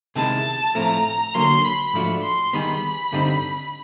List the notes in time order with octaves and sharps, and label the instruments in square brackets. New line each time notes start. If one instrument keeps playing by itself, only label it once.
[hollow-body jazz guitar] C3 D#3 G#3 B3 E4 [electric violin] A5
[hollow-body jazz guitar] A2 F3 A3 C4 [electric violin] A#5
[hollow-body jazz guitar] D3 F#3 A#3 [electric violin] C6
[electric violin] B5
[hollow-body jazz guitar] G#2 F3 A3 D4 F#4
[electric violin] C6
[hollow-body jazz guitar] D#3 G3 B3 D#4 G#4 [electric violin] B5
[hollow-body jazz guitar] G2 D3 G3 C4 D#4